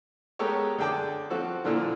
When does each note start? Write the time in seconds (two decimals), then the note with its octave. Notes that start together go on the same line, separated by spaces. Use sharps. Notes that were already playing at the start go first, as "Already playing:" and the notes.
0.39 G#3 B3 G4 A4 A#4 C#5
0.78 D3 G#4 G5 A5 D6
1.30 F3 C4 F#4 A4
1.64 A#2 D3 E3 F3